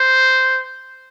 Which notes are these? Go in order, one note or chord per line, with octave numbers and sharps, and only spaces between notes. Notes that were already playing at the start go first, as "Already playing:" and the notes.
Already playing: C5